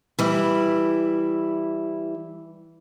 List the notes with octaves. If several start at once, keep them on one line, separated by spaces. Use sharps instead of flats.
E3 G3 E4